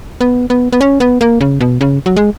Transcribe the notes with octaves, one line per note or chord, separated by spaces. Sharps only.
B3
B3
B3
C#4
B3
A#3
C#3
B2
C#3
F#3
G#3